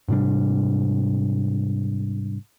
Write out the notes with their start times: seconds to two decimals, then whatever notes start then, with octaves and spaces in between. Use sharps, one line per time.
0.08 G#2 C3 G3 D4